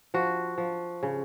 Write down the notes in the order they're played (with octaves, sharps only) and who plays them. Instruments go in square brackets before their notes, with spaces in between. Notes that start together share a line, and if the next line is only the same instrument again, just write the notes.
[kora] F3 F#4
F3
C#3